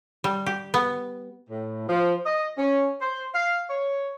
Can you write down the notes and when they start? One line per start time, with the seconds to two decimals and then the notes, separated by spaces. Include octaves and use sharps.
0.24 G3
0.46 G4
0.74 B3
1.50 A2
1.89 F3
2.26 D#5
2.58 C#4
3.01 C5
3.34 F5
3.69 C#5